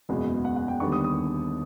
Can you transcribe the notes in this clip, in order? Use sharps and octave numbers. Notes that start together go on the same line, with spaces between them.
F#1 E2 B2 G#3 B3
F#5
F#5
G5
D#2 D3 G3 B3 D4 C#6
D#6
D#6